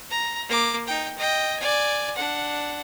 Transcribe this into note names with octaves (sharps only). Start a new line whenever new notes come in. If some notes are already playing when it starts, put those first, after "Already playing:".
A#5
A#3 D6
D#4 G5
D#5 G5
D5 G#5
D4 F#5